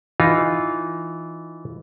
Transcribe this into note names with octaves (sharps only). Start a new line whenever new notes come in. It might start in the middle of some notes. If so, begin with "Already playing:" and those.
E3 D#4 F4